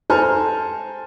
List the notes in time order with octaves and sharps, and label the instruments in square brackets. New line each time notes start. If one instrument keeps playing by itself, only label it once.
[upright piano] A4 C5 G#5 A#5 C6 F6